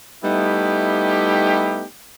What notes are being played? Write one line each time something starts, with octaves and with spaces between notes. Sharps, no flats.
G3 A3 B3 D#4 E4 G4